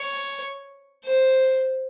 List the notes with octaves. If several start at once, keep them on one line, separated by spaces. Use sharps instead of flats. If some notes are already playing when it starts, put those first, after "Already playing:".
Already playing: C#5
C5